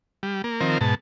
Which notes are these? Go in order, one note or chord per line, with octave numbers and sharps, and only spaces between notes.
G3
A#3
D#3 F3 C4 A#4
G#2 B2 A5